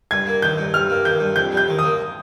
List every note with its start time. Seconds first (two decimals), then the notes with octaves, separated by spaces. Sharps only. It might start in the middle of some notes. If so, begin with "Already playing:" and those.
0.11 G2 G#6
0.27 A#3
0.42 D#3 G6
0.58 G2
0.74 G2 F6
0.90 A#3
1.05 D#3 G6
1.20 G2
1.36 F2 G6
1.52 G3 G6
1.68 D#3
1.79 A#3 D#6